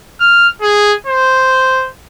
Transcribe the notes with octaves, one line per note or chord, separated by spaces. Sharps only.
F6
G#4
C5